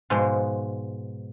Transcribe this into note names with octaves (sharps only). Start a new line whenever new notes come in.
G#2 B2 F3 G#3